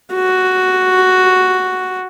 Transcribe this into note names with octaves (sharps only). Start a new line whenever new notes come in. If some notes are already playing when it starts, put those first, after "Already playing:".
F#4